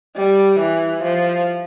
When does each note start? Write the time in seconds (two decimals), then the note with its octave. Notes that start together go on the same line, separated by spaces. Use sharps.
0.16 G3
0.60 E3
1.03 F3